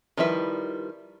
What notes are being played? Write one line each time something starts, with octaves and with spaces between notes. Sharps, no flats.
D#3 F3 G3 E4 B4